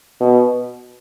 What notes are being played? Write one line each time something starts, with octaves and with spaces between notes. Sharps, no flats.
B2